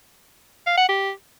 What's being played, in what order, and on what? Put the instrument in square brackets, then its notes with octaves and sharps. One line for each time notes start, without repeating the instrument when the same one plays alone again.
[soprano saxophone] F5
F#5
G4